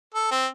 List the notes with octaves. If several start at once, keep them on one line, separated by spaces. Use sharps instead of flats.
A4
C4